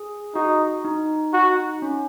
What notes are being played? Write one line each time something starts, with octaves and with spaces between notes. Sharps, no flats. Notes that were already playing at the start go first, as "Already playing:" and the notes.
Already playing: G#4
D#4 F#4
D#4
F#4
C#4